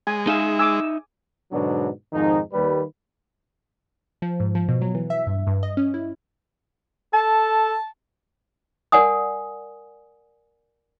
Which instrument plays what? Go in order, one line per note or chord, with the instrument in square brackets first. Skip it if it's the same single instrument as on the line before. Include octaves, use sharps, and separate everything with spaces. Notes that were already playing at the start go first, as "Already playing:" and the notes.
[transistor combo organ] G#3 [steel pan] G#5
[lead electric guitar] D#4 E5 [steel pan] G#4 F5
[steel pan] G#5 D6 [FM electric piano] E6
[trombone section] G#2 B2 D3 F#3 B3 D4
F2 G#2 D#3 F3 D#4
D#2 G3 B4
[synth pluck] F3
G#2
F3
B2
F#3
E3
E5
G2
G2
D#5
C#4
E4
[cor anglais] A4 [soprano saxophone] A5
[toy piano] A#4 D5 F#5 G#5 D#6